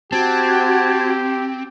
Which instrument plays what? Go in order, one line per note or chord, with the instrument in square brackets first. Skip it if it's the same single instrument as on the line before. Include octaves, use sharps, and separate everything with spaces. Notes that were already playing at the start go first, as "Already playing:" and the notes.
[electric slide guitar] C4 [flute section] F#4 G#6 [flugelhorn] G4 [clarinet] A5